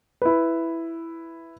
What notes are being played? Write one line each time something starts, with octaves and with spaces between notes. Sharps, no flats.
E4 B4